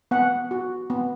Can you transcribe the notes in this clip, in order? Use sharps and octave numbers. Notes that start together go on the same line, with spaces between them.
B3 F#5
F#4
B3